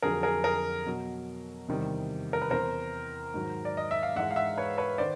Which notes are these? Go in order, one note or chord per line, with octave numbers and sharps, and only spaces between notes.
F2 D3 F#3 G#4 A#4
G#4 A#4
G#4 A#4
B2 F#3
E2 C3 D#3 G3
A#4
B4
E2 C3 E3 A#4 C5
G#2 D#3 F#3
D5
D#5
E5
F5
G#2 E3 G#3 E5 F#5
F5
E5 F#5
B4 C#5
B4 C#5
D#3 C5 D5